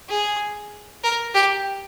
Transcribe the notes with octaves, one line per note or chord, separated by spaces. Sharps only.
G#4
A#4
G4